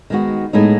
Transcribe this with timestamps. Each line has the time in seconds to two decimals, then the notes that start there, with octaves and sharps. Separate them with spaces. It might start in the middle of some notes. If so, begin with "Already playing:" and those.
0.10 D#3 G#3 B3 F#4
0.53 A2 G#3 B3 D#4